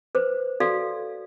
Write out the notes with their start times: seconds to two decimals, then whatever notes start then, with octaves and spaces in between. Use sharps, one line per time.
0.15 B4 C5
0.60 F#4 A4 D5 F5